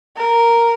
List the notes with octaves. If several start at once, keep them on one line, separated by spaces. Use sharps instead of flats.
A#4